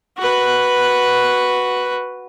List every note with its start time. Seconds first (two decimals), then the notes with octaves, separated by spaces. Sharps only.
0.18 F#4 B4